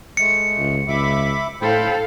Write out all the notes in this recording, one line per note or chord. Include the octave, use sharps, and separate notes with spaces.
G#3 A3 C#7
C#2
C#2 E5 B5 D6
A2 A4 C5 F5 G5 B5